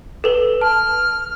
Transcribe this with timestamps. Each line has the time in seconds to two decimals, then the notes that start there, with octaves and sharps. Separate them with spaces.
0.24 A4 B4 G7
0.61 A5 F6